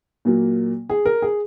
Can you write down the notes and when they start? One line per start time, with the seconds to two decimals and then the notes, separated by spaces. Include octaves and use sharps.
0.25 A#2 F#3 A#3
0.90 G#4
1.05 A#4
1.22 G#4